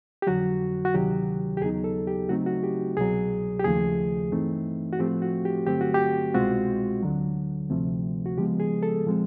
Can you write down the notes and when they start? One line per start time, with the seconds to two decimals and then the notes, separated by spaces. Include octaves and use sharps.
0.22 G4
0.27 F2 D3 F#3 F#4
0.85 F#4
0.94 D2 C3 D#3 F#3 G4
1.57 G4
1.62 D#2 C#3 F#3 B3 D#4 G#4
1.84 A4
2.07 G4
2.29 C#3 F#3 A3 C4 D#4 F#4
2.46 F#4
2.63 G4
2.97 C2 B2 F#3 G#4
3.59 G4
3.64 D#2 C#3 F3 A3 G#4
4.32 G2 E3 A3 C4 D#4
4.93 F#4
4.99 A2 F3 A3 C4 F4 G4
5.22 F#4
5.45 G4
5.67 G2 D3 F#3 A3 C4 G4
5.81 F#4
5.94 G4
6.34 C2 B2 G#3 C4 F4 F#4
7.02 D2 D3 F#3
7.70 D2 C3 F3 A3 C4
8.26 F#4
8.37 C#3 F3 G#3 B3 G4
8.60 G#4
8.83 A4
9.06 A#2 F3 G#3 C4